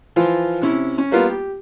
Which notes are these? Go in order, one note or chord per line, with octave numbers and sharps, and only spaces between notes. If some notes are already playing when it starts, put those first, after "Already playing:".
E3 F3 F4
C3 C#4 E4
C#4
G3 A#3 B3 F4
G4